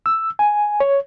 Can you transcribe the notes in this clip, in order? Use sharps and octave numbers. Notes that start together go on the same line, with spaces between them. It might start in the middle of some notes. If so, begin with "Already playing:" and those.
E6
G#5
C#5